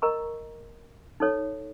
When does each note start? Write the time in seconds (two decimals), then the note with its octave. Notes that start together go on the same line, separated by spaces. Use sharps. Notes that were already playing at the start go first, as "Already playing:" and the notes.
0.02 A#4 D#5 A#5 C#6
1.20 D#4 A4 C#5